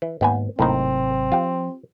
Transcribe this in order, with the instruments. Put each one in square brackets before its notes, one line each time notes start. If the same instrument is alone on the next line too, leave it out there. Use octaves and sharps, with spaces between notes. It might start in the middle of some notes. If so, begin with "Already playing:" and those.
[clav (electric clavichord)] E3
[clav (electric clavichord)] D#2 B3 G#5 [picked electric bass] G#2
[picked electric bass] G#1 C3 F#3 [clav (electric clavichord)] A2 A#3 D#4 [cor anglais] C4
[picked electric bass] F3 [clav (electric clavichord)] F4 G4